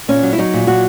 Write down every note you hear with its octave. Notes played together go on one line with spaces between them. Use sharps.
A#2 C#4
F#3
E4
F#3 D#4
A#2
F#3 F#4